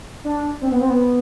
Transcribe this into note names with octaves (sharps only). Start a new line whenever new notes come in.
D4
C4
B3
C4
B3